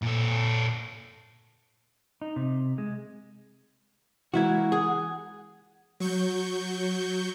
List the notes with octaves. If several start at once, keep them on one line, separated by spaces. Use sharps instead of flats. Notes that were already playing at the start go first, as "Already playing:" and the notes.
A#2 A4
D#4
C3
G#3
E3 G#3 A#3 E4 F#4 F#5 G#6
G#4
F#3 C#6 G6